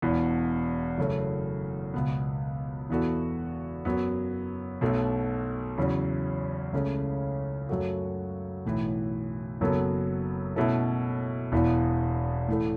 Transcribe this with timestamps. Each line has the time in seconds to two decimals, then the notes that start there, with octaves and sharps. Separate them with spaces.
0.02 E1 E2 B2 B3
0.98 F#2 C#3 F#3 A3
1.94 C#2 B2 B3
2.89 E2 E3 B3 F#4 A4
3.85 F#2 F#3 B3
4.81 B1 B2 A3
5.78 E2 C#3 F#3 C#4
6.73 C#2 C#3 A3 C#4
7.69 F#2 F#3 A3 F#4
8.65 B1 A2 E3
9.61 F#1 F#2 F#3 B3 A4
10.56 B2 A3 C#4 E4 A4
11.52 E1 E2 E3 B3
12.48 A2 E3 A3